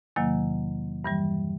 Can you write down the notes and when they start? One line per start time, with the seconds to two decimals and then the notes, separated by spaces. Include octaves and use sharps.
0.16 E2 C3 D#3 F#3 A#3
1.04 G2 E3 G3